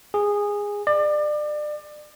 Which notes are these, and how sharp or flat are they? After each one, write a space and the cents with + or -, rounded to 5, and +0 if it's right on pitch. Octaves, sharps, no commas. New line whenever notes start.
G#4 -15
D5 +30